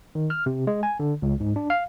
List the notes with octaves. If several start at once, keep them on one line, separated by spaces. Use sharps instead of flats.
D#3
F6
C3
G#3
G#5
D3
C#2
G#2
D4
F5